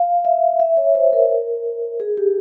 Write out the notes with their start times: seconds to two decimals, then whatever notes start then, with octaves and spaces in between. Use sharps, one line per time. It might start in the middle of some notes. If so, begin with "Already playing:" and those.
Already playing: F5
0.25 E5
0.60 E5
0.77 C#5
0.95 C5
1.13 A#4
2.00 G#4
2.17 G4